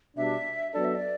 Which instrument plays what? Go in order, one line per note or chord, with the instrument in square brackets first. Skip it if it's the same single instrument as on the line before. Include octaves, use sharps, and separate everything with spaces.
[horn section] B2 G3 D4 [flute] E5
[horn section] F#3 B3 D4 A4 [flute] D5
[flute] E5
D5